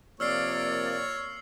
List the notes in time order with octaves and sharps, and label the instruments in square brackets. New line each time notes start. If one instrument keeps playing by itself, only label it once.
[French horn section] C3 F3 A#3 [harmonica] C#5 [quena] D5 [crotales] E6 F6 C7